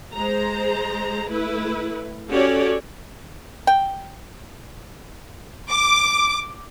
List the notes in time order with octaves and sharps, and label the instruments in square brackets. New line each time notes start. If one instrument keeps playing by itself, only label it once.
[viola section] G#3 C5 A#5
A3 E4 B4
C#4 F#4 G4 A4 C#5 D5
[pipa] G5
[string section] D6